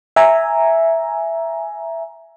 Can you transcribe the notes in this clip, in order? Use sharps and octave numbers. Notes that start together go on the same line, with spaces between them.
E5 G#5 A#5